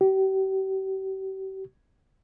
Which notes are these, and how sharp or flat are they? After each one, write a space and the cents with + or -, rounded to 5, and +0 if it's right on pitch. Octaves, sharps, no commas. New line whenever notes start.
G4 -40